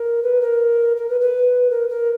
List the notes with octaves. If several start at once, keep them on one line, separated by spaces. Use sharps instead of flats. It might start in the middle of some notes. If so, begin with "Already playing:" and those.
Already playing: A#4
B4
A#4
A#4
B4
B4
A#4
A#4